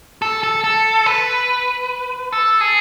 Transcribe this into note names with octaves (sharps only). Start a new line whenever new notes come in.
A4
A4
A4
B4
A4
G#4